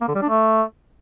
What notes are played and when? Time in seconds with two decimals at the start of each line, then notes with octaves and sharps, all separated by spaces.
0.01 A#3
0.08 D3
0.15 G3
0.22 D4
0.29 A3